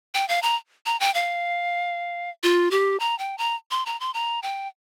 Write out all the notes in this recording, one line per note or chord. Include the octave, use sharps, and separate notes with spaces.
G5
F5
A#5
A#5
G5
F5
F4
G4
A#5
G5
A#5
C6
A#5
C6
A#5
G5